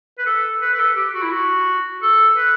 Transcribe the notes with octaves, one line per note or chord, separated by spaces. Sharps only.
B4
A4
B4
B4
A4
G4
F#4
E4
F#4
A4
B4